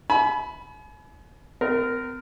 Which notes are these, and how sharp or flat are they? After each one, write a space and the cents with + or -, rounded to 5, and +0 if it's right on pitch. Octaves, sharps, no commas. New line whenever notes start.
G#5 +40 B5 +0
C4 -45 A#4 -5